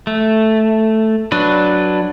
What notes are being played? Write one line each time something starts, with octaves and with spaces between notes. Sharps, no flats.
A3
F#3 D4 B4